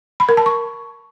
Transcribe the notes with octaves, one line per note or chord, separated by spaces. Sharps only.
B5
A#4
A5
C#6